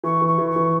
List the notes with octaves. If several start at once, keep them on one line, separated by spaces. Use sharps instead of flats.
E3 C#6
E3
C#6
E3
C#6
E3